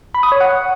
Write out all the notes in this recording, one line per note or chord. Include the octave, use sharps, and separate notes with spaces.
B5
D#6
C#5
F#5